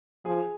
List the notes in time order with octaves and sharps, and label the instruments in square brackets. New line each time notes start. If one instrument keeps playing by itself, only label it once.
[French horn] F3 [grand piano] G#4 G#5